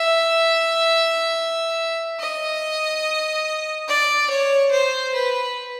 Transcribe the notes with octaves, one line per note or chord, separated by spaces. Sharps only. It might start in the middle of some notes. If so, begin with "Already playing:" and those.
Already playing: E5
D#5
D5
C#5
C5
B4